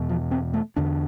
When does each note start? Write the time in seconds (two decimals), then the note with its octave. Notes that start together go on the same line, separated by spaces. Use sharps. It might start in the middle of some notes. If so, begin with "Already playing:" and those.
Already playing: E2 B2
0.09 F3
0.31 C4
0.54 A3
0.76 E2 D3 D4